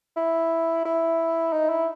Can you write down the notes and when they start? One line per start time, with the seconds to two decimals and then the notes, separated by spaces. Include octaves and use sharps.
0.17 E4
0.85 E4
1.53 D#4
1.69 E4